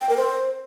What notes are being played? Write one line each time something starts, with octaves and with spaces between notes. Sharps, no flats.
G5
A#4
C5